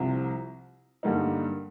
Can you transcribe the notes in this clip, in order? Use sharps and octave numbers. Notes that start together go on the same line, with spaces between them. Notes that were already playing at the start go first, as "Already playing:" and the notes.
Already playing: C2 C3 F3
G2 D3 G3 A#3 D#4